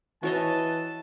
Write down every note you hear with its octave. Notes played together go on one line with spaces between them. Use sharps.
E3 F#4 C#5 D#5 A5